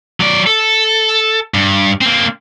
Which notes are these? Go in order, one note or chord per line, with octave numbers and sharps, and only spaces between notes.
F#3 D5
A4
G2
A#3 C4